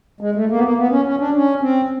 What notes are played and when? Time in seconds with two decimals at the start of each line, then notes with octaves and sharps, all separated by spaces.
0.21 G#3
0.35 A3
0.50 A#3
0.57 B3
0.64 A#3
0.77 B3
0.91 C#4
1.06 C#4
1.20 D4
1.35 C#4
1.61 C4